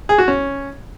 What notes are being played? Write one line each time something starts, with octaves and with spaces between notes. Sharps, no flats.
G#4
F#4
C#4